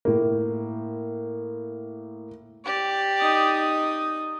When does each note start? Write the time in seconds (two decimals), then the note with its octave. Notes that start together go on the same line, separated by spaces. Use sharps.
0.05 A2 A#3
2.65 G4 D5
3.20 D#4 D#6